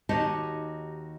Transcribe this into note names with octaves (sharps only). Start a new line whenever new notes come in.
D#2 D#4 F#4 G4 D#5 A5